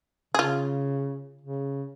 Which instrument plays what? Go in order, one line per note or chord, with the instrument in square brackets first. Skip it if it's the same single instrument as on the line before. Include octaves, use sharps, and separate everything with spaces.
[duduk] C#3 [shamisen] F4 G#4
[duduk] C#3